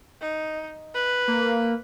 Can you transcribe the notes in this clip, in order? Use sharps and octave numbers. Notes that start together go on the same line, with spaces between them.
D#4
B4
A#3